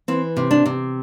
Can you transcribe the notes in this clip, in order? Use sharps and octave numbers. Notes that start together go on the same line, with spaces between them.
E3 C4
C3
D4
C3